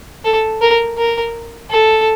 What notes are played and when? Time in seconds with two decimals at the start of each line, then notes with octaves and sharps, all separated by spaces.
0.25 A4
0.62 A#4
0.98 A#4
1.70 A4